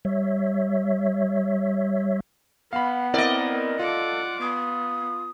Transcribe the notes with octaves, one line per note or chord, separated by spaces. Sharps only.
G3 C#5 E5
B3 F5 F#5 B5
C4 E4 A#4 D5 D#5
F4 A4 F#5 D6
B3 D#6